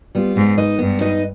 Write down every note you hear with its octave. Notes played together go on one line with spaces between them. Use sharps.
G3 B3 F4
G#2 B3
D#4 B4 D#5
G2 B3
D#4 B4 D#5